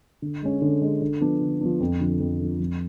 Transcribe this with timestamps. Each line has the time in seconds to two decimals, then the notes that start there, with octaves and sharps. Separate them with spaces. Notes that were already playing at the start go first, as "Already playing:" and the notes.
0.22 D3
0.42 G#3 C#4
0.62 D3
0.82 G#3 C#4
1.02 D3
1.21 F3 B3 D4
1.41 D3
1.61 F3 B3 D4
1.80 F2
2.00 D3 F3
2.20 F2
2.40 D3 F3
2.60 F2